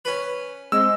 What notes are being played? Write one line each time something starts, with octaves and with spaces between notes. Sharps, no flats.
C#4 B4
G#3 C4 D#5 E6